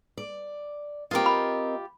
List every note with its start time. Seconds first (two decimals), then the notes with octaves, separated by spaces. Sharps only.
0.18 D5
1.11 C4 F4 G4 A#4 D#5
1.26 B5